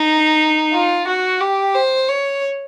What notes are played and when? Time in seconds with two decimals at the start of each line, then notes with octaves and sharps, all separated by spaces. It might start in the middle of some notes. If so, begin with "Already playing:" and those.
Already playing: D#4
0.74 F4
1.08 F#4
1.41 G4
1.75 C5
2.09 C#5